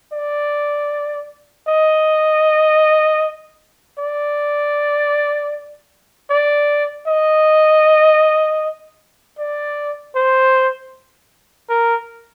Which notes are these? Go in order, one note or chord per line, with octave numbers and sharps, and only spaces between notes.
D5
D#5
D5
D5
D#5
D5
C5
A#4